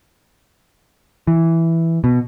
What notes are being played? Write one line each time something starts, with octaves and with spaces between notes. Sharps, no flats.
E3
B2